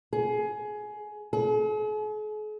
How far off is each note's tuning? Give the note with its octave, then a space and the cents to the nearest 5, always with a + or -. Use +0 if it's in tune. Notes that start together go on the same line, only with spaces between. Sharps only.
G#4 +20
G#4 +45